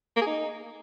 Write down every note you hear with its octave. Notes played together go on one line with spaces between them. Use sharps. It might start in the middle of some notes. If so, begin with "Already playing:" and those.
A#3
G#4
D#4